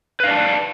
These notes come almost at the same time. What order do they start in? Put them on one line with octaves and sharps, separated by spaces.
B4 F5 D5 A5